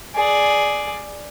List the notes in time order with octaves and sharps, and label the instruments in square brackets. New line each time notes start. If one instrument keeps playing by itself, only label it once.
[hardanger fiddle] G#4 D5